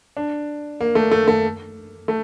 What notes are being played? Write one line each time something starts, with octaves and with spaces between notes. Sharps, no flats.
D4
A#3
A3
A3
A3
A3